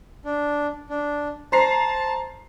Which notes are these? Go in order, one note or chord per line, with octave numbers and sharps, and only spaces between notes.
D4
D4
C5 A5 A#5 C7